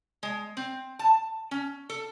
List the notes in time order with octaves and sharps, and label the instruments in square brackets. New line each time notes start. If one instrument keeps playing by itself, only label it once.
[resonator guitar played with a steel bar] G#3
C4
A5
C#4
A4